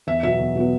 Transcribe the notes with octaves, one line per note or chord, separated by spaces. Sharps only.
E2 E5
B2 F#3 B3 E5
E2
B2 F#3 B3